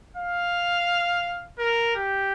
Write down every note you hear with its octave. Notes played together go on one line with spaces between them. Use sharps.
F5
A#4
G4